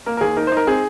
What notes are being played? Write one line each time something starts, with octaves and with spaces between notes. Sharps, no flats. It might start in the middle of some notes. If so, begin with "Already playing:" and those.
A#3 A#4
A#4
D#2 G#4
D#4 A#4
C5
D#4 A#4
C4 G#4